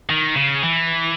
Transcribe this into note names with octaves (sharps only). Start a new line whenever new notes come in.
D#3
C#3
E3